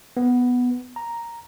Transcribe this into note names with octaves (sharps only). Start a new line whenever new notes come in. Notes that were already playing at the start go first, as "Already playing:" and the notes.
B3
A#5